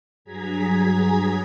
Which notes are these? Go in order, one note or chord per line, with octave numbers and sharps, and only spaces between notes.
G2 F#3 G#4 A#5 G#6 B6